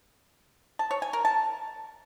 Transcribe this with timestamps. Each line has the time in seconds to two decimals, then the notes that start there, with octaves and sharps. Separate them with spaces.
0.79 A5
0.91 C#5
1.02 G#5
1.13 A#4
1.25 A5